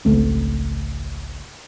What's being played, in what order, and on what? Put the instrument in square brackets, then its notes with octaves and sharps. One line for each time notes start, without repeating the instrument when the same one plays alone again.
[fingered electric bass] G#1 C#2 A3 C4